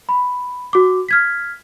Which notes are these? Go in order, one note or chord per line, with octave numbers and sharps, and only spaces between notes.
B5
F#4 D6
F6 G#6 B6